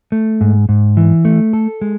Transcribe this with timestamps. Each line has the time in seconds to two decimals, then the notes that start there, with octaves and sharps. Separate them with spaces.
0.12 A3
0.41 G#2
0.69 G#2
0.97 E3
1.25 A3
1.53 A4
1.81 G#3